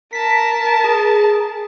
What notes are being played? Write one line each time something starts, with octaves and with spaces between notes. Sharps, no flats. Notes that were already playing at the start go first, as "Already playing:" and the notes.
A#4 A5 B6
G#4